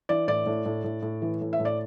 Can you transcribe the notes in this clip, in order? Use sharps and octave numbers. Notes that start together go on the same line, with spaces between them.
E3 D5
A2 D5
A2
A2
A2
A2
E3
A2
E5
A2
D5